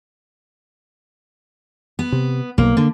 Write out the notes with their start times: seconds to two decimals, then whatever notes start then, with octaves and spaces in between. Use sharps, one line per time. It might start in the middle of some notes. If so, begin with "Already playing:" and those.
1.99 B3
2.12 C3
2.58 B1 A#3
2.77 D3 A#3